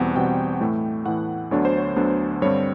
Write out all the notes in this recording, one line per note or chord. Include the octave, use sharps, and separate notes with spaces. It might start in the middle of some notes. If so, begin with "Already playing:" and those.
Already playing: E2 B2 G3 C4 F#5
E2 B2 G3 C4 G5
A2 E3 A3
A2 E3 A3 F#5
D2 D3 F#3 B3 D4 C#5
C5
C#5
D2 D3 F#3 B3 D4
G2 D3 G3 C4 C#5